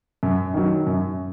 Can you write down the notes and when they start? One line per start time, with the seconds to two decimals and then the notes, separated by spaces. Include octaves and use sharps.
0.23 F#2
0.54 D#3 F#3
0.87 F#2